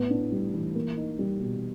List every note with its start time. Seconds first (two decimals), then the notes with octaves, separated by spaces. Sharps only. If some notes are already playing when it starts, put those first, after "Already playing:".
Already playing: A2 B3
0.10 D4
0.32 G3
0.54 E3
0.75 A#3
0.97 D#4
1.19 G3
1.40 B2